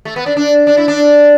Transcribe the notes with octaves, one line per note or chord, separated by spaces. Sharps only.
A3
B3
D4
D4
D4
E4
D4